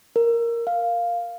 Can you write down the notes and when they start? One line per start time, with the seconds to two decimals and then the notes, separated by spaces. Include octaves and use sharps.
0.16 A#4
0.67 F5